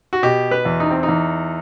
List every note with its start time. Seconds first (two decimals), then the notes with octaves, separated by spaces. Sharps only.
0.13 F#4
0.23 B2 G4
0.51 B4
0.65 E2
0.80 D#4
0.91 C4
1.03 D#4
1.08 E2